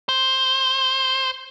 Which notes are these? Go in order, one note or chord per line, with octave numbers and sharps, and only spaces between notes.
C5